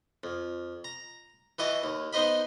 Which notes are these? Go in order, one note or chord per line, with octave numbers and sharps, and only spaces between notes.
F2
A#5
E3 F#4 D#5 A5
D#2
B3 D#4 C5 D#5 B5